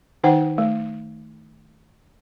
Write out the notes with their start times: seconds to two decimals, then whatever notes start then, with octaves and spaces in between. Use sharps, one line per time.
0.24 D#3 D#4 C5 F#5 G5
0.58 A3